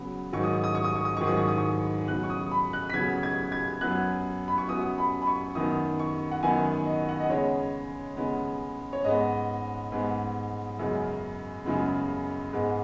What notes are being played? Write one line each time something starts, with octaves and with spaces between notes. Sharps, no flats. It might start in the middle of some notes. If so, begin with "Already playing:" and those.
Already playing: C#3 F#3 B3
G#2 D#3 F#3 C#6
D#6
C#6
D#6
C#6
D#6
C#6
D#6
G#2 D#3 F#3 C#6
D#6
C#6
D#6
C#6
C#3 F#3 B3 F#6
C#6
D#6
B5
F#6
B6
C#3 F#3 B3 G#6
G#6
G#6
F#2 F#3 B3 F#6
B5
C#6
F#2 F#3 B3 D#6
B5
B5
C#6
F#2 D#3 B3 D#6
C#6
F#5
F#2 D#3 B3 G#5
D#5
F#5
D#5
C#3 G#3 B3 C#5
C#3 G#3 B3
C#5
G#2 G#3 B3 D#5
G#2 G#3 B3
F#2 C#3 G#3 B3
F#2 C#3 G#3 B3
G#2 G#3 B3